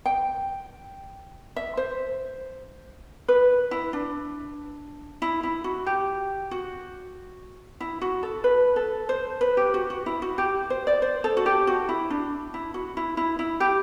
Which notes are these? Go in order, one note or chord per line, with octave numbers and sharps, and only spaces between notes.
G5
E5
C5
B4
E4
D4
E4
E4
F#4
G4
F#4
E4
F#4
A4
B4
A4
C5
B4
G4
F#4
F#4
E4
F#4
G4
C5
D5
C5
A4
F#4
G4
F#4
E4
D4
E4
F#4
E4
E4
E4
G4